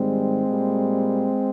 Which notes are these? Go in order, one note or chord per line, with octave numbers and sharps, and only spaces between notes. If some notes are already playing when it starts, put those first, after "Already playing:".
Already playing: G#2 D#3 G3 G#3 C4
A#2 G3